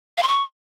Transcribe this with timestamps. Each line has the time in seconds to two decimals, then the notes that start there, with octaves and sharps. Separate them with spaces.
0.17 F5
0.23 C6
0.28 C#6